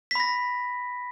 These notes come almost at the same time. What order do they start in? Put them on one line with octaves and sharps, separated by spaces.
B6 B5 A#6